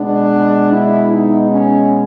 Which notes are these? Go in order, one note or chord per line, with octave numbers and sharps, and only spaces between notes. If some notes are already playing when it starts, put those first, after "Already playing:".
Already playing: B2 G#3 B3 D4
E4
D#4
C#4